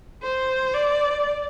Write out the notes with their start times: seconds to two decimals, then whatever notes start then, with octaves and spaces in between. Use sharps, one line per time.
0.23 C5
0.74 D5